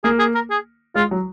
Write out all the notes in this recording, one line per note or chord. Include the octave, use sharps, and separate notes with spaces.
A#3 G#4
G#4
A#4
G#4
G#3 F4
F#3